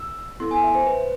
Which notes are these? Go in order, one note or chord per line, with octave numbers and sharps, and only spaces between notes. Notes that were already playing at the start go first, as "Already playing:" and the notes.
Already playing: E6
B3 E4 A4 C6
G#5
E5
C5
B4